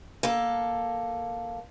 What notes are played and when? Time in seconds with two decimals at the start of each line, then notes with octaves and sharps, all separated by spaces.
0.23 A#3 A4